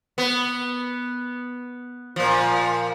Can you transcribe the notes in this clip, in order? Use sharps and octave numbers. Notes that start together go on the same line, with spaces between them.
B3
A#2 F3